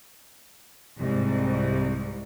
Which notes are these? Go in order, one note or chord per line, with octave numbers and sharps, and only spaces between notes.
C2 G#2